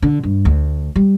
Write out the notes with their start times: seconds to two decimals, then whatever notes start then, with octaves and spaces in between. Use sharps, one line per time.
0.02 D3
0.23 G2
0.45 D2
0.96 G3